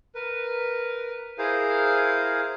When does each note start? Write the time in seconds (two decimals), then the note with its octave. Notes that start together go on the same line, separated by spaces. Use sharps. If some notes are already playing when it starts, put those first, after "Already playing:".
0.15 A#4 B4
1.38 E4 G#4 A#4 C5 F5